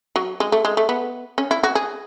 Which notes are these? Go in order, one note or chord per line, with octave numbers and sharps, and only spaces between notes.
F#3
G#3
A3
G#3
A3
B3
C#4
E4
F#4
G#4